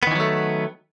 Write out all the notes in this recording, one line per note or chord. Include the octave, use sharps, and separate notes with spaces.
D#3 E3 F#3 A3 B3